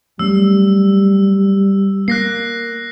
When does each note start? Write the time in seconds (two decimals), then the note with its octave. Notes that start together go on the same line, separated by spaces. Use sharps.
0.19 F#3 G3 A3 C#4 E6
2.08 A#3 F#6 A#6 C7